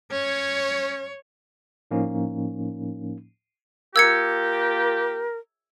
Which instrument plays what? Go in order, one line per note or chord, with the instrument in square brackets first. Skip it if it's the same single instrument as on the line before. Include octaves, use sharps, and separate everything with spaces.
[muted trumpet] C#4 [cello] C#5
[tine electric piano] A2 F3 A#3 C#4 D#4
[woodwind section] A#3 F4 G4 [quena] A#4 [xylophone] E6 G#6 C#7